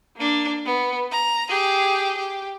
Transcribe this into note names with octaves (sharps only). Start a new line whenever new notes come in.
A#3 D4
B3
A#5
G4 G#4
G4